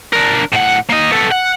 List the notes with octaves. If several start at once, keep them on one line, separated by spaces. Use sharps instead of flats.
D4 A#4
A2 F#5
A#3 D#5
B3 A4
F#5